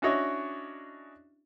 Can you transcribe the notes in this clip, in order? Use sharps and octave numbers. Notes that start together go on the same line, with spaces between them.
C#4 D4 E4 F#4 C#5 D#5